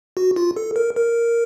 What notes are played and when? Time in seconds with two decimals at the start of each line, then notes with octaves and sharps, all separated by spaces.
0.17 F#4
0.36 F4
0.56 A4
0.76 A#4
0.96 A#4